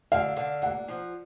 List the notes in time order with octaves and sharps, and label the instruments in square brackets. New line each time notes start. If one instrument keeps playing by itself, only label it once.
[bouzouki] D3 [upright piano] F5
[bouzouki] D3
[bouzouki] A#3 [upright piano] F#5
[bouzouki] F3